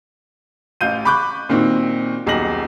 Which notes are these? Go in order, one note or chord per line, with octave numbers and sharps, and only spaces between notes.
A1 F5 G6 D#7
B5 C#6 D6 F#6 G6
A#2 D#3 C4 F#4
D#1 B1 G4 G#4 A#6 F#7